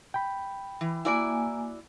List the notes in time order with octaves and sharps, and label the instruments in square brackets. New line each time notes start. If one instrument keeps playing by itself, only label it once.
[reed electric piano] G5 B5
[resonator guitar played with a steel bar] E3
[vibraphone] A#3 G#5 [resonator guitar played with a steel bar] E4 F#4 D5